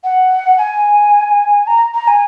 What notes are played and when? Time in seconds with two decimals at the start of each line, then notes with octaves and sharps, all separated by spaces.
0.04 F#5
0.58 G#5
1.67 A#5
1.94 A#5
2.08 G#5